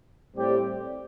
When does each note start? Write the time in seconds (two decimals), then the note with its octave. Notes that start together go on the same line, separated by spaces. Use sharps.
0.35 A2 G3 C4 G4 D5